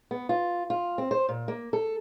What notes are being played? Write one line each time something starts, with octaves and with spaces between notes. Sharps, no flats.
B3
F4
F4
C4
C5
A#2
A#3
A4